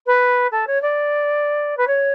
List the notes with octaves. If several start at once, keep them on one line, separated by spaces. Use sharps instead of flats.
B4
A4
C#5
D5
B4
C#5